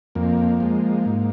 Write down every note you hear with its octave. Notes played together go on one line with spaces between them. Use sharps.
F2 A#3
F3 G#3
G#2